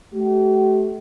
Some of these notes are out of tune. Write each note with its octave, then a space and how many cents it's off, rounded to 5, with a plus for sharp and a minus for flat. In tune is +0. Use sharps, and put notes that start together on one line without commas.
A3 -35 G4 -45